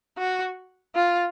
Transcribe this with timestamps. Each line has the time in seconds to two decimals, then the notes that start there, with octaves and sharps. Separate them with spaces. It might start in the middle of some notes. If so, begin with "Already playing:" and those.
0.18 F#4
0.95 F4